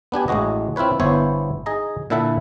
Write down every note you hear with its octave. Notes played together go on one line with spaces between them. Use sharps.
B3 D4 G4 G#5
A1 A2 G#3 F#4 D#5
C4 E4 F4 B4 C#5
G1 B3 E4 C5 C#5
D#4 G#4 D#5 A#5
A#2 D3 E4 A4 E5 F#5